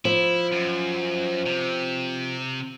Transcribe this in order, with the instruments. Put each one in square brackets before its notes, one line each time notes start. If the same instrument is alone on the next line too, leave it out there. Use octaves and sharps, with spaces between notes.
[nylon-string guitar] F3 [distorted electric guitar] E4
[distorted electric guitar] F#2
C3